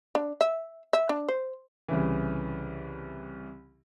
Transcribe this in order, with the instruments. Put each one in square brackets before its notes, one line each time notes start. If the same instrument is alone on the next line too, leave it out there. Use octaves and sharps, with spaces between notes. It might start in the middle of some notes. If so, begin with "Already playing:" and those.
[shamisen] D4
E5
E5
D4
C5
[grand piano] C2 C#3 E3